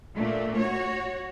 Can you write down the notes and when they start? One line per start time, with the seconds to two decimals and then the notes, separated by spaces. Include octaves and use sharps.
0.14 A#2 A3 D4
0.57 F#4 C#5